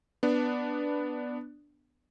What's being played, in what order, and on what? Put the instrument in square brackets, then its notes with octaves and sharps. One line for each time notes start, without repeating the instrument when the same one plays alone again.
[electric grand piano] B3 D4